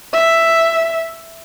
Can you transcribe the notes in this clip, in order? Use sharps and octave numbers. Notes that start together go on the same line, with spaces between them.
E5